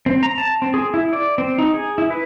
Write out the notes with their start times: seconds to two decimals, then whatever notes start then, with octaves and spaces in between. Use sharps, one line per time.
0.06 C4
0.23 A#5
0.38 A5
0.62 C4
0.74 G#4
0.94 E4
1.13 D5
1.38 C4
1.58 D#4
1.74 G#4
1.98 E4
2.10 B4